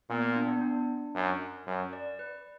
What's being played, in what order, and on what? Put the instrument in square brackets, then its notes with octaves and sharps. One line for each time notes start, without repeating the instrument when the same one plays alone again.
[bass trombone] A#2 [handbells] B3
[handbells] D4
B3
D4
[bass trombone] F#2
F#2
[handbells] D5
B4